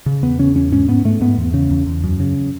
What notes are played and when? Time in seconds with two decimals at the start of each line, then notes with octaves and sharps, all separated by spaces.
0.06 C#3
0.22 E2 B3
0.39 C#3 C#4
0.55 E2 C#4
0.72 G#2 C#4
0.88 G#2 B3
1.05 G#2 A3
1.21 G#2 B3
1.38 E2
1.54 C#3
1.71 E2
1.87 E2
2.04 F#2
2.20 C#3